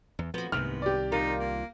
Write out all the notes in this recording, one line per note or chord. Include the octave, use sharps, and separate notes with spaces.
E2
F2 F3 B3 F#4
C2 G#2 C3 D#3 B3 F6
G4 D5
D4 D#4 F4 A#4
A#3